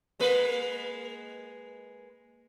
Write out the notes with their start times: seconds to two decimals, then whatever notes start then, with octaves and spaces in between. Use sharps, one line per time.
0.20 G#3 A#3 B4